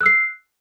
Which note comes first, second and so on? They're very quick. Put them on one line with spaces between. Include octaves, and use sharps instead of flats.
F#6 E6 C7